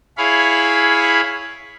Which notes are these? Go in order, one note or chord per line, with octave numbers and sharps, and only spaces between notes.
E4 G#4 C#5 F5 B5